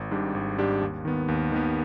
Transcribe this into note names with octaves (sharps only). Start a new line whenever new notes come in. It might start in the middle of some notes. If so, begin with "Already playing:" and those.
Already playing: G#1
G#2 G3 D4 G4
G#1
G#2 G3 D4 G4
D#2
D#3 B3
D#2
D#3 B3